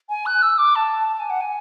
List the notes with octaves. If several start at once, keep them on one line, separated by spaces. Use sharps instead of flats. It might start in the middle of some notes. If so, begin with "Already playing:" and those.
G#5
F#6
E6
D6
A5
A5
G#5
F#5
G#5